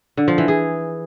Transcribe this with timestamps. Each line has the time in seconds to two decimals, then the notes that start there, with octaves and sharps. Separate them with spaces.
0.17 D3
0.28 F3
0.38 E3
0.48 G#4